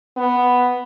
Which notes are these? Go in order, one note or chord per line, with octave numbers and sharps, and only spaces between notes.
B3